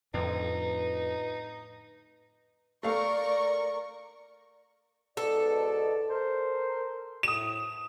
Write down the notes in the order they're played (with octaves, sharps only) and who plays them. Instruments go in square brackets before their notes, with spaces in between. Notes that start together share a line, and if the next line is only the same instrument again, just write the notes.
[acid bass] F2 [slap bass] A2 D3 [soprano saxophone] D#4 [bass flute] B4
[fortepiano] A3 F5 [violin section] A#4 D5 C#6
[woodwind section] G#2 B2 D5 [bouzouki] A4
[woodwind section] A#4 C5
[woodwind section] A2 [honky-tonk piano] D#6 E7